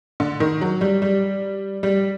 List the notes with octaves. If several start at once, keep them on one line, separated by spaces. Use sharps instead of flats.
D3
D#3
F#3
G3
G3
G3